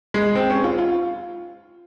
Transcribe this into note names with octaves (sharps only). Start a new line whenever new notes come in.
G#3
C4
C#4
F4
F4